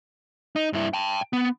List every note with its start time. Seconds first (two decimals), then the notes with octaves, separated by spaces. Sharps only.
0.56 D#4
0.73 G2 E4
0.93 G5 A5
1.33 B3